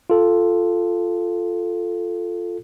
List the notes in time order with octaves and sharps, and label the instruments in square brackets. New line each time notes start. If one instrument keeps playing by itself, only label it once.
[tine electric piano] F4 A4